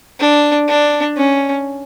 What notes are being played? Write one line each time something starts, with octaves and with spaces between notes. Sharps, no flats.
D4
D4
C#4